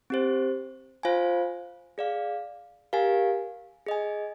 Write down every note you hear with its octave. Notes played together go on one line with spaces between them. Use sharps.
C4 G4 C5
F4 C5 F5 G#5
G#4 D5 F5
G4 A#4 F5 G#5
G#4 D#5 G#5